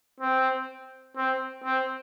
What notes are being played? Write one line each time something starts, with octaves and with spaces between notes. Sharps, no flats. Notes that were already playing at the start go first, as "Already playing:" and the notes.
C4
C4
C4